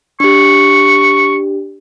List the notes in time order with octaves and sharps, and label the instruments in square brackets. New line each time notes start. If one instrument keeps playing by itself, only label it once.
[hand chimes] D4 G4 [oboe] C#6